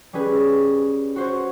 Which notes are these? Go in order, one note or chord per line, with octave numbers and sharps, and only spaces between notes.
G3 C#4 G#4 B4
F#4 C5 C#5